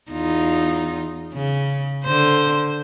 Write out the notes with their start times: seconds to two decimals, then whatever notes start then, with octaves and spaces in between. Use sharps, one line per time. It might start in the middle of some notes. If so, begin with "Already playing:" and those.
0.11 E2 D#4 F4
1.33 C#3
2.05 D3 C5